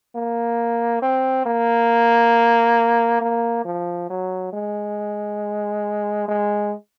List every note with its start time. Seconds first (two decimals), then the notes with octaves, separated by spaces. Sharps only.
0.16 A#3
1.02 C4
1.46 A#3
3.21 A#3
3.65 F3
4.10 F#3
4.53 G#3
6.28 G#3